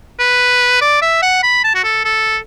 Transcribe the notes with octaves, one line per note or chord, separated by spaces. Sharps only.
B4
D5
E5
F#5
B5
A5
F#4
A4
A4